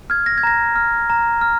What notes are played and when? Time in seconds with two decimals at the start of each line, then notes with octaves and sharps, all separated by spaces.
0.10 F6 G#6
0.26 A#6
0.38 G#6
0.43 A#5 A#6
0.76 F6
1.10 A#5
1.41 F6